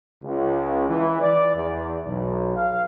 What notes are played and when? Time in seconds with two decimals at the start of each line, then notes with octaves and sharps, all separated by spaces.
0.23 C#2
0.89 E3
1.21 D5
1.55 E2
2.08 B1
2.56 F5